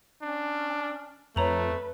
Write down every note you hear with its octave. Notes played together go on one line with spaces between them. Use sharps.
C#4 D4
F2 A3 B4 C#5 A#5 F#7